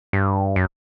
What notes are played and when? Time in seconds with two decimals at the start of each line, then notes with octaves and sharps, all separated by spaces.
0.13 G2
0.56 F#2